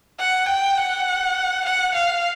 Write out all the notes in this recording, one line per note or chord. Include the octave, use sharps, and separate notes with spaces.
F#5
G5
F#5
F#5
F5